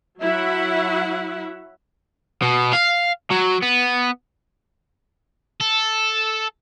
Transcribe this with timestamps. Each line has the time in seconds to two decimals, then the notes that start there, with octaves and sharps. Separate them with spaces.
0.21 F#3 E4 E5 F#5
2.42 B2
2.73 F5
3.30 F#3
3.62 B3
5.60 A4